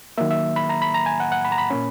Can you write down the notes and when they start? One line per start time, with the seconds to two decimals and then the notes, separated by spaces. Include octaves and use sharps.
0.18 D#3 F#3 A#3 E5
0.31 E5
0.56 B5
0.69 A#5
0.82 B5
0.94 A#5
1.06 G#5
1.20 F#5
1.32 F#5
1.45 B5
1.52 A#5
1.58 B5
1.71 A#2 A#3 C#4